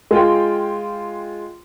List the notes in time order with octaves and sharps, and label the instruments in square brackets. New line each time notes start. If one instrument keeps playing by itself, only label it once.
[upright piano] G#3 F4 G5